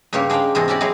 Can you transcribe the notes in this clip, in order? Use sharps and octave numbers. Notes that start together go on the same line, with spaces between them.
G2 C#3 A#3 G4 C#5
G#3 D4 C5 F5 G5
E2 G#2 C3 G#4 A4 D#5
C#4 E4 F#4 G4 D5
F#3 G#3 D#4 E4 G#4